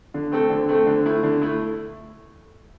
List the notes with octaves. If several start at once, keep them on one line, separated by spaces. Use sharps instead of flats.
D3
A3 C4 A4
D3
A3 C4 A4
D3
A3 E4
D3
A3 E4